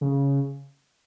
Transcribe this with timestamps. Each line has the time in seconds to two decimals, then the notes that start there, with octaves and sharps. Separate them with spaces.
0.01 C#3